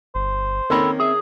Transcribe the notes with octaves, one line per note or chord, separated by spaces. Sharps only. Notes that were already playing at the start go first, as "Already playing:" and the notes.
G1 C5
D#3 A#3 C4 C#4 A4 B5
G#4 E5